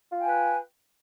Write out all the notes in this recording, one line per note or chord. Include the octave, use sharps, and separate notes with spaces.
F4 B4 G5 G#5